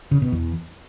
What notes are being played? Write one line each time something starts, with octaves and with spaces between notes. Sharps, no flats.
C#3
B2
E2